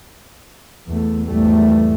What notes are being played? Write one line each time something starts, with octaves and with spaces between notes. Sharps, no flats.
E2 A3
G#1 E2 E3 G3 A3